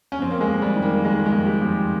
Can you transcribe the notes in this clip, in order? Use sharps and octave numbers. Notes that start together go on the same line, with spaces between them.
C#4
F2 C4
A#3
G#3
F2
G3
D#3
A#3
D#3 G#3
G#3
F2
G4
F2